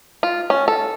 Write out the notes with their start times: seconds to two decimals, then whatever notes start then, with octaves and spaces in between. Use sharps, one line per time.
0.23 F4
0.50 C#4
0.68 A4